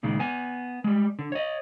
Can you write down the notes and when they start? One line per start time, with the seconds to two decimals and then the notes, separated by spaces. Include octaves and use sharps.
0.03 C#2 A#2 D#3 G#3
0.19 B3 G#5
0.84 G3 G#3
1.19 D3
1.32 C#5 D#5